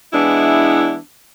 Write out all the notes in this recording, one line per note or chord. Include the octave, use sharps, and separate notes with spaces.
E3 G#3 B3 D4 E4